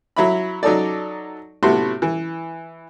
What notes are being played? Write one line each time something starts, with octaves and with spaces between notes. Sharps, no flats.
F#3 E4 B5
F#3 D#4 A4 D5
A2 C3 A3 B3 F#4 C6
E3